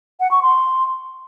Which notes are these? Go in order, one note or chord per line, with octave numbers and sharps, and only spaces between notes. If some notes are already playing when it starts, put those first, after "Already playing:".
F#5
C#6
C6